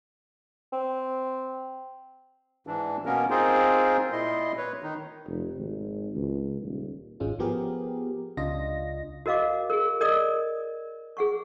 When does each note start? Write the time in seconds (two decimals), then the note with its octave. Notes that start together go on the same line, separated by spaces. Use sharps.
0.72 C4
2.67 G#2 E3 D4
3.06 B2 A#3 B3 C#4 A#4
3.30 C4 D#4 F4 G#4 A#4 C5
4.12 A#2 E4 D#5 C6
4.57 B4 C#5
4.82 D#3 D#4
5.27 F1
5.58 G#1
6.15 C#2
6.62 D#1
7.20 G#1 G#2 G#3 C#4 F4
7.39 F3 B3 G4 G#4 A#4
8.37 C#2 C#3 D4 F4 D#5 A#6
9.26 F#4 A#4 D#5 F5 D6
9.70 G#4 A#4
10.01 A#4 D5 D#5 D#6
11.17 G#4 F#5 C#6